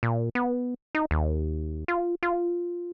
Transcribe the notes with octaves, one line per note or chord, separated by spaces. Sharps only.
A#2
B3
D#4
D#2
F4
F4